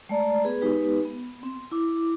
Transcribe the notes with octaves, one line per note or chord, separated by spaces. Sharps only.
G#3 A3 D5 A#5
B3 G#4 B4
G#3 B3 D#4 G4 B4
B3
C4
E4 D6